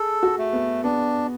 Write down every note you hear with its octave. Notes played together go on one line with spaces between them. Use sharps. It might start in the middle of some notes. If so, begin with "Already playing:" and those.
Already playing: G#4 A4
F#4
A3
B3
B3 D4